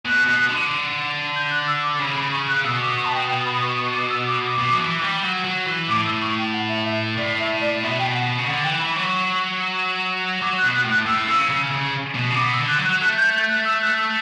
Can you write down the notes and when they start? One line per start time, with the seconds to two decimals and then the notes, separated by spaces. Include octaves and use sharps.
0.05 B2 F#6
0.27 B2
0.49 D3
1.36 G6
1.51 F#6
1.68 E6
1.83 D6
1.99 C#3 B5
2.16 B5
2.32 C#6
2.49 F#6
2.65 B2 E6
2.81 D6
2.97 C#6
3.05 A5
3.14 G5
3.29 G5
3.46 B5
3.62 C#6
3.78 C#6
3.94 D6
4.10 E6
4.27 D6
4.43 D6
4.58 B2
4.74 F#3
4.81 E3
5.03 G3
5.24 F#3
5.45 F#3
5.66 E3
5.89 A2 D6
6.05 E6
6.21 C#6
6.37 G5
6.53 F#5
6.69 E5
6.85 E5
7.17 A2 D5
7.40 E5
7.61 D5
7.83 B2 E5
7.99 G5
8.15 F#5
8.38 C#3
8.47 D3 F#5
8.63 E3 G5
8.79 E3 B5
8.96 F#3 C#6
10.41 F#3 D6
10.58 F#6
10.64 B2
10.74 F#6
10.84 A2
10.90 F#6
11.06 A2 E6
11.27 C#3
11.50 C#3
11.72 C#3
12.15 B2
12.30 C#3
12.35 B2 D6
12.53 E6
12.57 D3
12.68 F#6
12.78 F#3
12.85 F#6
13.01 A3 F#6
13.17 G6
13.33 G6
13.48 F#6
13.65 E6
13.82 F#6
13.98 E6